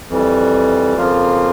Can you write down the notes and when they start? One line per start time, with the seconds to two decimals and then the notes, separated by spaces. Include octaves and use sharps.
0.09 F2 E3 G3
0.97 F2 C#3 F3 A#3 F4